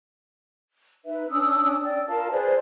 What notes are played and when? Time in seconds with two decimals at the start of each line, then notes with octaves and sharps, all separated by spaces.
1.05 D#4 B4 E5
1.30 C#4 D4 D#6 E6
1.82 D5 G5
2.07 F4 A#4 F5 A5
2.31 G#4 B4 C5 D5